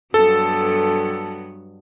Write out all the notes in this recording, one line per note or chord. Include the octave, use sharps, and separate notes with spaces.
G2 F#3 B3 A4